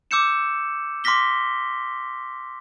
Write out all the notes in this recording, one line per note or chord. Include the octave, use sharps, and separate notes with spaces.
D6 E6 G6 C#7 E7
C6 D6 F6 A#6 B6 G7